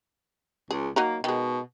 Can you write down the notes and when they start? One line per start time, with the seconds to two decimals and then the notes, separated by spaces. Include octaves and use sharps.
0.71 C#2 G#4
0.96 F#3 A#3 D#4 A#4
1.24 B2 D#3 G#3